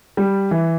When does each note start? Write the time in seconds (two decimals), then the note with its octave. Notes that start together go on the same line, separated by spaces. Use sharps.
0.17 G3
0.51 E3